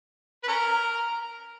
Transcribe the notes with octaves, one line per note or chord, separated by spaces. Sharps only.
B4
C#4 A#4